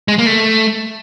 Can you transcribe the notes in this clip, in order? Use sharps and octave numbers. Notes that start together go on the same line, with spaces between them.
G#3
A#3
A3